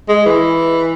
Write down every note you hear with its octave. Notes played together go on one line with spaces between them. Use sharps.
G#3
E3